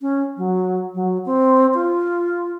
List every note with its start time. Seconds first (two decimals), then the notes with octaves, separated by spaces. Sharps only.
0.01 C#4
0.37 F#3
0.95 F#3
1.26 C4
1.74 F4